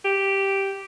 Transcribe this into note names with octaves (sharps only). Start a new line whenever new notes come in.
G4